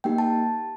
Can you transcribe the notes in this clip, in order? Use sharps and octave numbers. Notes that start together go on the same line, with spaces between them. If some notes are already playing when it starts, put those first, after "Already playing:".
A#3 D#4 G4 G5
A5